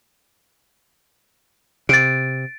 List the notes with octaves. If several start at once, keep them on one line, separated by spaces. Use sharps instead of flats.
C3 A6 D7